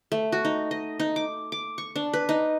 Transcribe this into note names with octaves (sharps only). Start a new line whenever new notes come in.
A3
F#4
D#4
D#5
D#4
D6
D6
C#6
D4
B4
D#4